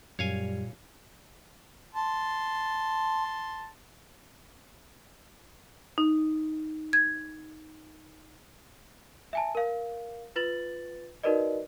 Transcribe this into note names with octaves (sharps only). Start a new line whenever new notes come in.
F#2 A#2 G3 C#5 F5 G#5
A5 C6
D#4
G#6
E5 G#5 A5
A#4 F5
F4 B4 A6 F#7
D#4 F#4 A#4 B4 D5 D#5